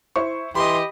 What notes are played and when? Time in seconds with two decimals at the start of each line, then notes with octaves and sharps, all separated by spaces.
0.16 E4 C5 C#6
0.55 E3 G4 D#5 B5 C6